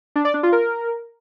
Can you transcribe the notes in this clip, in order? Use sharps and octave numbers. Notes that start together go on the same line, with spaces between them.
D4
D5
D4
F4
A#4